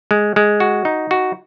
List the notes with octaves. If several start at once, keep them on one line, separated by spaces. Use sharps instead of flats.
G#3
G#3
F#4
D#4
F#4